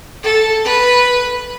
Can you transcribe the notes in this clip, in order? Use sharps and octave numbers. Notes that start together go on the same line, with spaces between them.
A4
B4